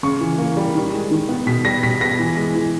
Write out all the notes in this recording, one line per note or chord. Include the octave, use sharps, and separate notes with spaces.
C#3 C#6
E3
A#3
G3
D#3
G#3
D#3
B3
B2 B6
G3 A#6
B2 B6
B3 A#6
E3
G#3
E3